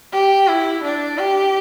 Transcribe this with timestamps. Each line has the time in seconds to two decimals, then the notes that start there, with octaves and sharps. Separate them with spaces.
0.13 G4
0.48 E4
0.84 D4
1.19 G4